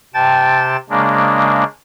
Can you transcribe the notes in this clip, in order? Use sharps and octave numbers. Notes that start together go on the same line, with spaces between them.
C3 G5 A5 A6
C#3 G#3 A#3 D4